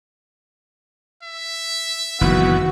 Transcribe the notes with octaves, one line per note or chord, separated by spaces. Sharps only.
E5
F#1 D#3 E3 B3 F#4